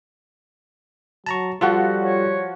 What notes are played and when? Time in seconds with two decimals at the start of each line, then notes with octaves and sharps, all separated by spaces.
1.26 F#3 A5 A#5 C#6
1.61 F3 G3 F4 F#4 A4 F#5
2.00 C#5